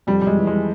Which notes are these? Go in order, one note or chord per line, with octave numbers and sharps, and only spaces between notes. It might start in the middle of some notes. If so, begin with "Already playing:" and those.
F2 G3
G3
G#3
E3
G#3